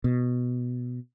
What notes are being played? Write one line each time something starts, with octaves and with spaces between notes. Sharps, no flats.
B2